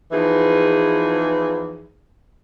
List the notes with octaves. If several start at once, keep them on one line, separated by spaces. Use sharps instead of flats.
E2 E3 F3 D#4 G#4